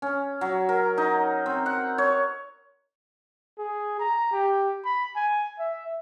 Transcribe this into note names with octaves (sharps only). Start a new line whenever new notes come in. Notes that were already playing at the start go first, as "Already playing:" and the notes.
C#4
F#3
A#4
D#4
C4
F#5
C#5
G#4
A#5
G4
B5
G#5
E5